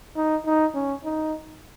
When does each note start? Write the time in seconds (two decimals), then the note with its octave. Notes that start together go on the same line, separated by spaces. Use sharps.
0.16 D#4
0.46 D#4
0.75 C#4
1.04 D#4